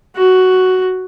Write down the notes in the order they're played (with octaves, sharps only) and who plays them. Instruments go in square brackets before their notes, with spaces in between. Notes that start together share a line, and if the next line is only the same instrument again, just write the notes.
[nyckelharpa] F#4